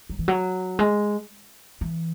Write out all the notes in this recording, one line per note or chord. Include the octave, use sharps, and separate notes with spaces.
F#3
E3
F#3
G#3
E3